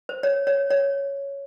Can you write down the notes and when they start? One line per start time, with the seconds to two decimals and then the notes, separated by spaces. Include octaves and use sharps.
0.09 C5
0.23 C#5
0.47 C#5
0.71 C#5